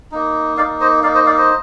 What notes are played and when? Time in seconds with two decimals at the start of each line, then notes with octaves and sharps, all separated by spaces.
0.12 A#3 D#4
0.57 D#4 D5 F5
0.62 A#3
0.80 C5 D#5
1.03 A#3 D#4 D5 F5
1.15 C5 D#5
1.26 D5 F5
1.38 C5 D#5